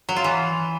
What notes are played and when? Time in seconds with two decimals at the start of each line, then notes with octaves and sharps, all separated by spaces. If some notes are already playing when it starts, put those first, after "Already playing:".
0.09 F#3
0.16 F4
0.24 E3